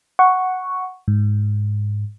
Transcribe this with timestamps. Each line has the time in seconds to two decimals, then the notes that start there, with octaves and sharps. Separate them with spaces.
0.19 F#5 C#6
1.08 G#2